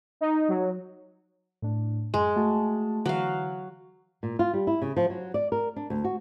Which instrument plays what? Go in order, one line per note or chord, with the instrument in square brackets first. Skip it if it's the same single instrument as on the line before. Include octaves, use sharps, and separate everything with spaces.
[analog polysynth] D#4
F#3
[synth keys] A2 D4
[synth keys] F#2 [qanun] G#3
[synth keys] A3 F#4 A5
[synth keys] D3 E3 [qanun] F#3 F5
[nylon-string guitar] A#2
F4
G3
E4
C#3
F3
F#3
D5
A#4
D4
D2
F#4